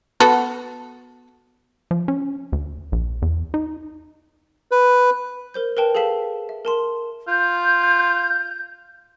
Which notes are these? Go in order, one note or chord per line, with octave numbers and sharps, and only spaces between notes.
B3 F#4 A4
F3
C#4
D2
A#1
E2
D#4
B4
A#4 C5 G6
A#4 B4 G5 A5
G#4 A4 F5 A5 B6
E5
A#4 A5 C6
F4 G6